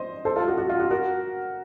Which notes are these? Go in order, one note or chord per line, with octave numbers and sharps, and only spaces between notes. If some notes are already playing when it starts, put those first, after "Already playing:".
Already playing: C5 D#5
A4 C5
F4 A4
F#4
F#4
F4
F#4
F#4 A#4